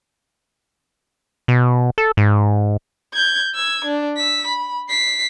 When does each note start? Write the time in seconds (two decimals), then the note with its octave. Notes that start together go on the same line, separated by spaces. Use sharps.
1.48 B2
1.98 A4
2.17 G#2
3.14 G6 G#6
3.54 E6 G#6
3.85 D4
4.17 E6 B6
4.47 B5
4.89 B6 C7